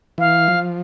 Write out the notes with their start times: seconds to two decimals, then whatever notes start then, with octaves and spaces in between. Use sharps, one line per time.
0.18 E3 F5
0.48 F3